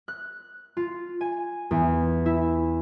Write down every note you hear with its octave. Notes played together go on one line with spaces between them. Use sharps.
F#6
F4
G#5
E2
E4